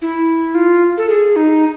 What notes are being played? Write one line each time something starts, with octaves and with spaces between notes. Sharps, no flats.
E4
F4
A4
G#4
D#4